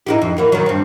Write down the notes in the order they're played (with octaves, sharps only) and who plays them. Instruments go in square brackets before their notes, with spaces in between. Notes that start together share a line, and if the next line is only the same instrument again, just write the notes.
[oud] D#4 E4 G4
F2
E3 A#3 F#4
D#3 F#3
G2 C4